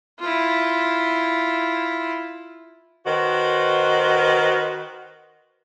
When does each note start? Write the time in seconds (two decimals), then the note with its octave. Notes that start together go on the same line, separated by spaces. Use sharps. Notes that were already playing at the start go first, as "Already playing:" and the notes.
0.20 E4 F4
3.06 D#3 F#4 B4 C5